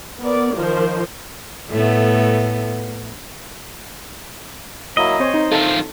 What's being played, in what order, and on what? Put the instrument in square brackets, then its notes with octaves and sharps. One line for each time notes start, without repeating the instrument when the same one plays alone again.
[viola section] B3 A#4 D5
D#3 F3 A#4 C5
[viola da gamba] A2 A3 B3
[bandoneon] F#3 A#3 E4 [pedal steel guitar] D#5
[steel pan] C4 C#5 [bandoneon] C5
[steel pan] D#4
[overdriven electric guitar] D#3 F4 [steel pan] A4